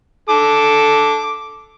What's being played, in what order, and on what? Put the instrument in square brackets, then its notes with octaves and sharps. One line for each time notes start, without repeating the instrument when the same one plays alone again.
[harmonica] A4 D6